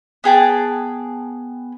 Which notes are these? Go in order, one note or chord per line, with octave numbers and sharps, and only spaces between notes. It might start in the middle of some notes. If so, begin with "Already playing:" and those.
B3 G#4 G5 A5